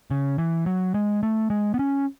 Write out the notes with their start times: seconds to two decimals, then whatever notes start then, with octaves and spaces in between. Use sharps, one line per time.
0.11 C#3
0.38 E3
0.66 F#3
0.94 G#3
1.23 A3
1.50 G#3
1.74 B3
1.79 C#4